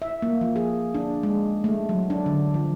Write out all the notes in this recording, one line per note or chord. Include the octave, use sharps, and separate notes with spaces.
E5
A#3
F3
G#4
D4
G#3
A3
F#3
D4
D3
F3